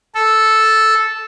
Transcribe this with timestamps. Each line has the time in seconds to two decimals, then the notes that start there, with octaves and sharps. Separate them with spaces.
0.15 A4